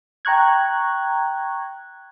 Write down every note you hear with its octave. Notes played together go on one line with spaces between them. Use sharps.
G5 A#5 C#6 F#6 G#6